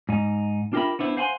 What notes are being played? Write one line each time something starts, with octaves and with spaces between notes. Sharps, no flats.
G#2 D#4
D4 F4 G4 A#4 E5 B5
B3 D4 E4 C5
C5 F5 F#5 G#5 A5 C6